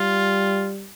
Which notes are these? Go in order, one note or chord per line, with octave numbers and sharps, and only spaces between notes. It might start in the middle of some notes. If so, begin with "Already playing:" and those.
Already playing: G3 F4